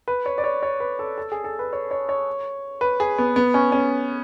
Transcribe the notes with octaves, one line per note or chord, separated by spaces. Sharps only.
B4
C#5
D5
C#5
C#5
B4
A4
A4
G#4
A4
B4
C#5
C#5
C#5
B4
G#4
B3
B3
C#4
C#4